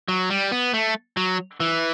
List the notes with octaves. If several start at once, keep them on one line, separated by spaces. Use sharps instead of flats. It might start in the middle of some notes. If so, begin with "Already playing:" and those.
F#3
G3
B3
A3
F#3
E3